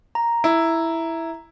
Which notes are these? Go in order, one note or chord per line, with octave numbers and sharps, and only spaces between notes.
A#5
E4